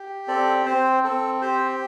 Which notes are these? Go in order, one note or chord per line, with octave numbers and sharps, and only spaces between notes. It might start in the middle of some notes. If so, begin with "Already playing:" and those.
Already playing: G4
C4 A4 D5
C4 C5
C4 A4
G4 C5